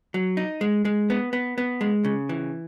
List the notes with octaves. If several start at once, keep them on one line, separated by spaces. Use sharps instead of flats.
F#3
D#4
G#3
G#3
B3
B3
B3
G#3
C#3
E3